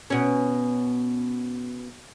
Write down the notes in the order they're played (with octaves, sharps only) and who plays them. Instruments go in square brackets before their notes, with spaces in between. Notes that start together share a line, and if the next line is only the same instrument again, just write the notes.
[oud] B2 C#4